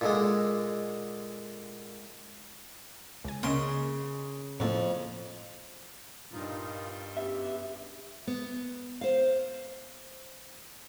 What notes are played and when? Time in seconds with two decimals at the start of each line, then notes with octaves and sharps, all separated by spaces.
0.01 A#2 D3 G#3
3.25 C#2 G#5
3.43 C#3 A#3 A#4 D#5 C6
4.60 F2 A2 A3 A#3
6.33 G2 A#2 D#4 F4
7.17 F#2 B3 G4 E5
8.27 B3
9.01 C5 F5